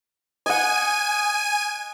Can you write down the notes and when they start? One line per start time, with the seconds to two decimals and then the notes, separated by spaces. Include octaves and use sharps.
0.46 D#5 F#5 G#5 D#7